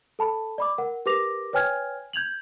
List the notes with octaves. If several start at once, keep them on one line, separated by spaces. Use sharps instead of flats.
A4 A5 B5
D5 B5 D6
A#4 F#5
G4 A#4 B4 D6 A#6 F7
B4 C#5 G5 G#5 F6 G#6
G6 G#6 F7 F#7